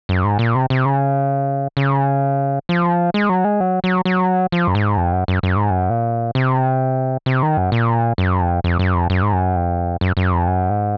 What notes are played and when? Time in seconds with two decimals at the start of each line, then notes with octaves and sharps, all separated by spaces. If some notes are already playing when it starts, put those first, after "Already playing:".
0.09 F#2
0.24 G#2
0.39 A#2
0.55 C3
0.70 C3
0.85 C#3
1.77 C#3
2.69 F3
3.14 G#3
3.29 F#3
3.44 G#3
3.60 F#3
3.84 F#3
4.05 F#3
4.52 F3
4.68 F#2
4.75 G#2
4.97 F2
5.12 F#2
5.28 F#2
5.43 F#2
5.56 G#2
5.70 F#2
5.90 A#2
6.35 C3
7.26 C3
7.43 D#3
7.57 F#2
7.72 A#2
8.18 F#2
8.41 F2
8.64 F2
8.79 F#2
8.94 F2
9.10 F#2
9.22 G#2
9.33 F#2
9.56 F2
10.01 F#2
10.17 F#2
10.32 F2
10.47 F#2
10.70 G#2